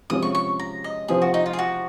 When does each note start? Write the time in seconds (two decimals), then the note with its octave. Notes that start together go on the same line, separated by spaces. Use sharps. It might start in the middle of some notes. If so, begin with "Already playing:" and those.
0.10 C3 F3 G#3 C#4 F#4 D#6
0.22 C#6
0.35 C#6
0.60 A#5
0.84 D#5
1.08 C3 F3 C4 G#4
1.22 F#4
1.34 D#4
1.46 F4
1.53 G#4
1.59 F#4